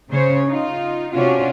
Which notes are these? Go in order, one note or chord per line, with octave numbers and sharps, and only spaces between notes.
C#3 C5 C#5
D#4 F4
C3 C#4 D4 F4 F#4